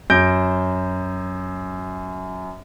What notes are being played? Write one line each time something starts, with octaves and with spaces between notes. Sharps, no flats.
F#2 G6 A#6 D7